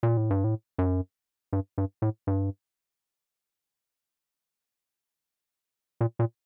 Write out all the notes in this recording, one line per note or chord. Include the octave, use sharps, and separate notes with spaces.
A#2
A2
G2
A2
F#2
G2
G2
A2
G2
A#2
A#2